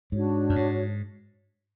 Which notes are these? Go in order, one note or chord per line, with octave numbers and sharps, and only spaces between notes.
G#2 D4 F#4 C#5
F#2
G#2